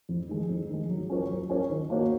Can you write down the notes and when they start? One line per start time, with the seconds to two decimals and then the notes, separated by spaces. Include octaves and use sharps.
0.09 F2
0.29 D#3 G#3
0.49 F2
0.70 D#3 G#3
0.89 F#3
1.10 C#4 F4 A#4 C#5
1.29 F#3
1.50 C#4 F4 A#4 C#5
1.70 D#3
1.90 A#3 D#4 F#4 C#5